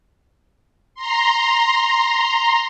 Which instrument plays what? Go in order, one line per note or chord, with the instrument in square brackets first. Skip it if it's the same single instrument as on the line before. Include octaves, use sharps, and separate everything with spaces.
[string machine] A#5 C6